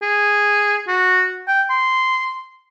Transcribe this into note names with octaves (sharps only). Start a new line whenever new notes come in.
G#4
F#4
G5
C6